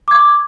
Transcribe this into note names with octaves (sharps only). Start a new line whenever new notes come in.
C#6 D6 G#6